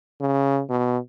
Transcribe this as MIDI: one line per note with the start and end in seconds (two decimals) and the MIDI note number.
0.21 0.62 49
0.70 0.98 47